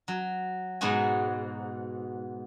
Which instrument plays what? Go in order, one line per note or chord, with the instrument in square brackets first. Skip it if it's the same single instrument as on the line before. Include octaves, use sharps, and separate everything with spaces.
[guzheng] F#3
G#2 B2 B3 F#4 G#5